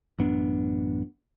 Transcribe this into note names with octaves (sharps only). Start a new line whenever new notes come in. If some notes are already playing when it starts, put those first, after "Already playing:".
A1 F#2 B3 D4